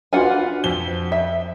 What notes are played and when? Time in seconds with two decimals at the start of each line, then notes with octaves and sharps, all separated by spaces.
0.13 D4 F4 F#4 B4 F#5 G#5
0.64 F2 G7
1.12 E5